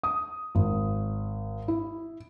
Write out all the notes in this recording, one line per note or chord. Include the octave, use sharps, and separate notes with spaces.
D#6
G#1
E4